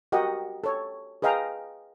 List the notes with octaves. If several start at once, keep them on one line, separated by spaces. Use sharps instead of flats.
F#4 G4 A#4 D#5 F#5
A4 C#5
G#4 B4 D#5 F5 G5 A#5